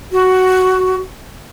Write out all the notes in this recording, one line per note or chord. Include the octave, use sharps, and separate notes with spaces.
F#4